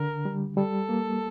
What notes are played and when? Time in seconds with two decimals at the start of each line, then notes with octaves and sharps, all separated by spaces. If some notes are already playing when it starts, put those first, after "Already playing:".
Already playing: D3 A#4
0.25 G3
0.57 G3 A4
0.89 A#3